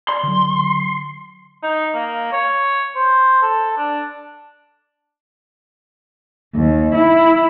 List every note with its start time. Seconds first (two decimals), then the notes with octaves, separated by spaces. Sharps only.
0.08 D5 C6
0.23 D3 F#3
1.63 D#4
1.94 A#3
2.33 C#5
2.96 C5
3.42 A4
3.78 D4
6.55 D#2
6.94 E4